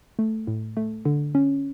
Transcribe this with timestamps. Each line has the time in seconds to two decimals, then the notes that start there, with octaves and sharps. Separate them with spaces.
0.19 A3
0.47 A2
0.77 A3
1.05 D3
1.35 C#4